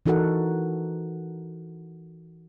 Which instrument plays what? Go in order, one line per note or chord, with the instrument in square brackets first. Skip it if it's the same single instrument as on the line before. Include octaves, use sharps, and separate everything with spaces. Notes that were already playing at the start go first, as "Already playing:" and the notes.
[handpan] E3 D#4 F#4 A4 A#4 F#5